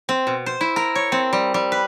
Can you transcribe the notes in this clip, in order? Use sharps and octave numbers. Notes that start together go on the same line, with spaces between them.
C4
B2
C5
E4
A#4
C#5
C4
G3
G3
B4